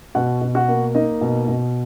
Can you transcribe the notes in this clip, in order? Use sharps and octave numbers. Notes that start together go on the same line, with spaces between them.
B2 F#4 F#5
B2
F#4 F#5
A#3
A#3 D#4 D#5
B2
B2